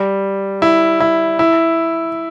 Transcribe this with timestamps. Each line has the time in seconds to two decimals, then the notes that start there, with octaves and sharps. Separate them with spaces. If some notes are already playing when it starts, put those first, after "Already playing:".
Already playing: G3
0.62 E4
1.00 E4
1.39 E4